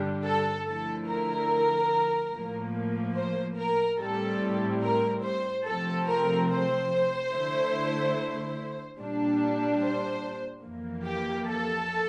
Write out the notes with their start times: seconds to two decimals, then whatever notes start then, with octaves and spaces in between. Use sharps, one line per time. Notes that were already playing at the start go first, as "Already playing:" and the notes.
Already playing: G2 D3 G3 D4
0.26 A4
0.67 D3 F3 A3 E4 A4
1.09 A#4
2.33 A2 F3 A#3
3.17 C5
3.58 A#4
4.00 A2 G3 C4 E4 A4
4.83 A#4
5.24 C5
5.65 C3 F3 A3 C4 A4
6.08 A#4
6.49 C5
7.32 D3 A3 E4
8.98 A#2 G3 D4
9.82 C5
10.64 F2 E3 A#3
11.05 G4
11.48 A4